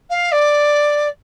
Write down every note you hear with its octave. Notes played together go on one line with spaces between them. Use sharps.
F5
D5